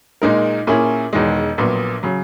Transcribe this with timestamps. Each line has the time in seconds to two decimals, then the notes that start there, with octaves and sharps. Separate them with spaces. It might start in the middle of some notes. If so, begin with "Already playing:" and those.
0.22 A#2 G#3 D#4 A#4
0.67 A#2 A#3 C#4 E4 G#4
1.13 E1 E2 D#3 G#3
1.58 A#1 A#2 F#3 B3
2.03 C#3 F#3